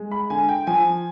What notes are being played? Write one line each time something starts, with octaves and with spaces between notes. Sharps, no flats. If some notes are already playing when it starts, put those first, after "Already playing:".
Already playing: G#3
B5
D3 G#5
G5
F3 G#5